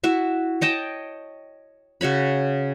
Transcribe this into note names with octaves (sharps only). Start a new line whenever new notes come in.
E4 F#4 E5
C#5 D#5 G5 A5
C#3 F#4 C#5 B5